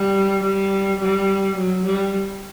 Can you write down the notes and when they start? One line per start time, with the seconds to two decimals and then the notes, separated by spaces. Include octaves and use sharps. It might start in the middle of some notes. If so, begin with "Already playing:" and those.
Already playing: G3
0.43 G3
1.00 G3
1.56 F#3
1.85 G3